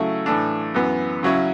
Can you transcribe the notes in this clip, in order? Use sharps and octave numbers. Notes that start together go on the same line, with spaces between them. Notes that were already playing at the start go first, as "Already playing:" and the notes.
Already playing: C#3 F#3 A3 E4 A4
A2 E3 A3 D4
F#2 E3 B3
C#3 F#3 C#4 E4